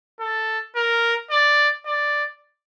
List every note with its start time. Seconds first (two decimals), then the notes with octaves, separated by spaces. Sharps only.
0.20 A4
0.76 A#4
1.31 D5
1.86 D5